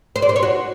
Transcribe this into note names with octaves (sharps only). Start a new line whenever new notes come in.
C5
D5
C5
C#5
F#4